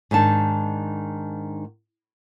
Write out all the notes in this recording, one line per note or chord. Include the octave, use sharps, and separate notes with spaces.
G#2 D#3 D4 A5